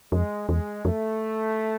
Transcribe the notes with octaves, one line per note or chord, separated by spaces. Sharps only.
F2 G#3
E2 G#3
F2 A3